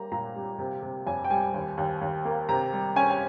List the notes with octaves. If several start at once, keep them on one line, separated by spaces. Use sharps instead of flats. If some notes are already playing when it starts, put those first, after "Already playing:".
Already playing: G3 A#3 A#5
A#2 A#5
G3
C3
C3
F2 G#5
G5
G3 G#5
D#2
D#2
D#2
A#3
C3 A#5
G3
C#4 G#5
G#5